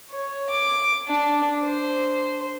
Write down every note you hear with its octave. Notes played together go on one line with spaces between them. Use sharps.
C#5
D6
D4
C5